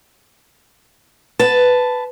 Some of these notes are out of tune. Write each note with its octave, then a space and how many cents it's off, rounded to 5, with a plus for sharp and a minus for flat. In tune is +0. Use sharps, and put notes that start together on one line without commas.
B4 +10 A5 +0